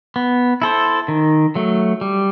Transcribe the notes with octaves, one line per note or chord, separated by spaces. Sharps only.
B3
E4 A4 C5
D#3
F#3 A3
G3